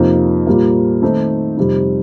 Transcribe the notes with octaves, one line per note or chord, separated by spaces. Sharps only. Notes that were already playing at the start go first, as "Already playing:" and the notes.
Already playing: F2 C3 F3 A#3 D#4
A#2 G3 A#3
D#3 A3 C4 D#4
F2 C3 G3 C4 D#4